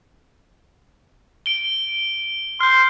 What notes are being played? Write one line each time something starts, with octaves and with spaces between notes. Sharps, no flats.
D7 G7
C6 F6 G6